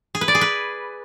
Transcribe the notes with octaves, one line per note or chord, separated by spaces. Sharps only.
G#4
B4
D5
G#4
B4